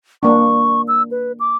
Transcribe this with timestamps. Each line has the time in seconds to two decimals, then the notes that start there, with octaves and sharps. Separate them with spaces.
0.23 A#3 D4 C#6
0.88 E6
1.11 B4
1.40 D6